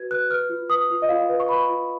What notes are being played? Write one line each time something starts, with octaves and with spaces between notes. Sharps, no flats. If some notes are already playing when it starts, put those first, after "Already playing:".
Already playing: F#4 B4 G#6
B4 F#6
B4 F6
F4
B4 D#6
F4
D#5
F4 F5
B4
C#6
B4 B5
F4